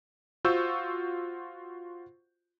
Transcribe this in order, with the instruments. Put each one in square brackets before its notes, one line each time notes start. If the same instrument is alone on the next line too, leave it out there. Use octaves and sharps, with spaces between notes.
[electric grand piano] F4 F#4 C5 C#6 E6 G6